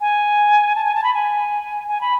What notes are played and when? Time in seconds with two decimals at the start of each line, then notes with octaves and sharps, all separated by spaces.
0.01 G#5
0.75 A5
0.85 G#5
0.95 A5
1.04 B5
1.14 G#5
1.89 G#5
2.01 B5